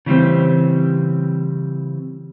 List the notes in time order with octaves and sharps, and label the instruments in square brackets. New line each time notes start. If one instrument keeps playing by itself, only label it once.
[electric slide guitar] C#3 E3 G3 C4